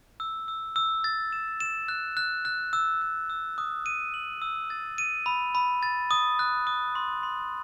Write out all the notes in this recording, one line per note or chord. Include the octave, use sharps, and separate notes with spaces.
E6
E6
E6
A6
E7
E7
F#6
F#6
F#6
E6
E6
E6
D#6
D#7
F#7
E6
A6
D#7
B5
B5
A6
D#6
F#6
D#6
C6
C6